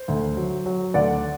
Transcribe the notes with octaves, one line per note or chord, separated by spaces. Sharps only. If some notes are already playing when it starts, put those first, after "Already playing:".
Already playing: C5
D2
F#3
F#3
D2 D5 F#5